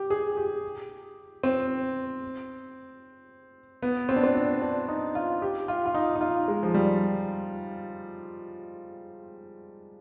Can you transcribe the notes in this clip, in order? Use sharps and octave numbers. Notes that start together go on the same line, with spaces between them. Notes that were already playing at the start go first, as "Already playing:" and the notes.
Already playing: G4
G#4
G4
C4
B3
C4
D4
C4
D4
D4
D#4
F4
G4
F4
F4
D#4
D#4
F4
G#3
F3
G3